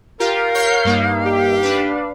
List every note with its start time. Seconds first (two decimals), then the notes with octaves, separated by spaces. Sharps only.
0.20 F4 G4 A#4 F5
0.54 C#5 G6 C7
0.84 G2 A#3 D#4
1.24 G4
1.63 D4 B4